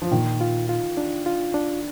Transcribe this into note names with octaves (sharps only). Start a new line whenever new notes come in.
F3
A#2 D#3
F4
F4
D4
F4
D4